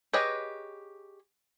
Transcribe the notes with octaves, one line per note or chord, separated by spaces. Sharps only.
G4 G#4 B4 C#5 D#5